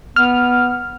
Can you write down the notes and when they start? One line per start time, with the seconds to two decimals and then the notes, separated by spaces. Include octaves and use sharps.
0.16 B3 F6